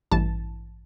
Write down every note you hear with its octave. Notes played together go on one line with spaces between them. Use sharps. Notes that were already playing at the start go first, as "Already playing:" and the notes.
A1 G2 E3 A5